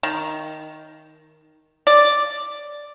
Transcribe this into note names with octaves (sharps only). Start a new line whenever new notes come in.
D#3
D5